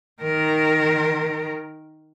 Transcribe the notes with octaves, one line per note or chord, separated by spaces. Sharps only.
D#3 A#4